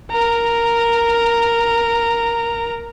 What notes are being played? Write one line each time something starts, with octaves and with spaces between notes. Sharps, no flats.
A#4 A#5